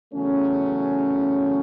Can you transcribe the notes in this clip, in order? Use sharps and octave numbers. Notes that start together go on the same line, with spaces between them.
E2 C#3 F#3 A3 C#4